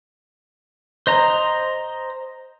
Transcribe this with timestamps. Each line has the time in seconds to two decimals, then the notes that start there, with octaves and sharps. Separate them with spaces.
1.07 C5 D#5 A#5